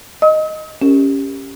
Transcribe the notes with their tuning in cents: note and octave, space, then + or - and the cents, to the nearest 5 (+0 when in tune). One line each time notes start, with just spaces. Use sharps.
D#5 +0 D#6 +45
C#4 +0 G4 +10 A#4 -20